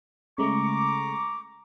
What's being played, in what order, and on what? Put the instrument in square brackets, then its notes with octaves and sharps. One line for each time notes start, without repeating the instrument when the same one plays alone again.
[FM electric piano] C#3 G#3 A3 [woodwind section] A#5 C#6 D6